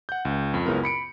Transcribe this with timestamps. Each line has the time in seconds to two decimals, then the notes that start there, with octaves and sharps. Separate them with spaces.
0.09 F#5 G6
0.25 C#2
0.54 F2
0.66 C#2 F#2 C#3 B3 E4 A#4
0.83 B5 C#7 D7